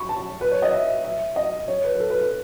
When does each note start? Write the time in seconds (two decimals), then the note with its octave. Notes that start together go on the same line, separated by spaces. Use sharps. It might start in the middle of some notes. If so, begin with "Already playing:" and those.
Already playing: B5 C#6
0.09 A5
0.41 B4
0.51 C#5
0.62 D#5
0.73 E5
1.04 E5
1.36 D#5
1.68 C#5
1.84 B4
1.95 B4
2.00 A4
2.10 B4
2.21 B4